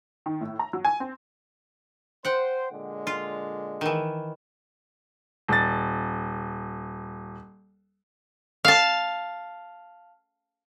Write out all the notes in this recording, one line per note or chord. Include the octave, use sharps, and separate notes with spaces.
D#3
A2
A#5
F#3
G#5
C4
C5 F#5 G5
A#2 D3 G#3
F4
D#3 E3
D#1 A6
F5 A5